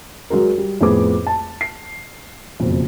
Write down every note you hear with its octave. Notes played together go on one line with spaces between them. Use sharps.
F#3 G#3 F#4 A#4
G3
F2 A2 B3 G#4 B4 D6
A5
C7
F#1 F2 B2